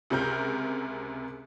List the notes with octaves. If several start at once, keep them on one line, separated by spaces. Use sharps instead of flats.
C#2 C3 G#3 A#4 G6